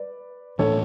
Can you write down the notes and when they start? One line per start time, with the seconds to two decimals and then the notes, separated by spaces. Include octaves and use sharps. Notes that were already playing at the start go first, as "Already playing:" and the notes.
Already playing: B4 D5
0.59 A2 E3 A3 D4 A4 C#5